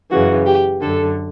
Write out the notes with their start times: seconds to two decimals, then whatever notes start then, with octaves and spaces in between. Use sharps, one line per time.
0.11 F#2 C#3 E3 F#4
0.47 G4
0.82 F#2 D3 A4